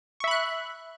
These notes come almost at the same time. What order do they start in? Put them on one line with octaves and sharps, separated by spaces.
C#6 E5 B5 F#6